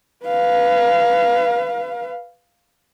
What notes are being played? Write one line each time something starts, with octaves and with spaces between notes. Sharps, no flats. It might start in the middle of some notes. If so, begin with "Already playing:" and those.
B4 F5